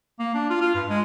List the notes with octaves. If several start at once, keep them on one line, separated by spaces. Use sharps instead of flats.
A#3
D4
F4
F4
G2
G#3